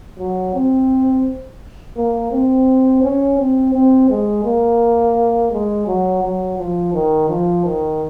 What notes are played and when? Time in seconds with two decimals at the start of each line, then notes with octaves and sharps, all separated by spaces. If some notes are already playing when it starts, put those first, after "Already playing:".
0.19 F#3
0.54 C4
1.97 A#3
2.32 C4
3.03 C#4
3.39 C4
3.74 C4
4.10 G#3
4.45 A#3
5.52 G#3
5.87 F#3
6.23 F#3
6.58 F3
6.94 D#3
7.29 F3
7.65 D#3